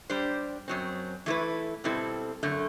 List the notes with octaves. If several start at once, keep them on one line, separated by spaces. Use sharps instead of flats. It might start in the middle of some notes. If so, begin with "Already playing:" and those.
G3 D4 G4 C5
F#2 F#3 C4
E3 A3 E4 B4
B2 G3 C4 E4 A4
F#2 D3 A3